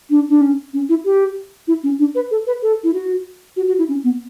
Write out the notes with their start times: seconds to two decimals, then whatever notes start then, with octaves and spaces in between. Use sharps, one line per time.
0.10 D4
0.29 D4
0.41 C#4
0.73 C#4
0.89 E4
1.05 G4
1.67 E4
1.83 C#4
1.99 D4
2.15 B4
2.31 A4
2.47 B4
2.62 A4
2.84 E4
2.93 F#4
3.56 F#4
3.68 F#4
3.78 E4
3.88 C#4
4.04 B3